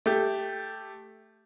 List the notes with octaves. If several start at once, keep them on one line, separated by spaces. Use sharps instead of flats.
A3 G4